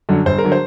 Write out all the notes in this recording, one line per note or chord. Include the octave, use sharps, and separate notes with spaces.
F#2 D3 F#3
G1 C5
A#4
D3 F#3
C5